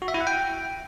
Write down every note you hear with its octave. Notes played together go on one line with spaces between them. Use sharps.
F#4
E5
E4
F#5
G5